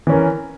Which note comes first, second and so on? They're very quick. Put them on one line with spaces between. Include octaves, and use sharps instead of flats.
E3 C#4 A#4